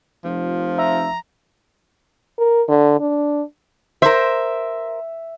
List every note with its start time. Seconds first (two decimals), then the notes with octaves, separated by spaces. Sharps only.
0.24 F1 F3
0.78 E5 A#5
2.39 A#4
2.68 D3
3.00 D4
4.02 A#4 C5 E5